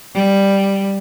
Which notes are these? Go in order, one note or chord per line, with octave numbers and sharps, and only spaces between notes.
G3